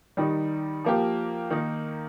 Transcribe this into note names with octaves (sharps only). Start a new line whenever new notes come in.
D#3 G3 D#4
F3 A#3 G4
D#3 A#3 D#4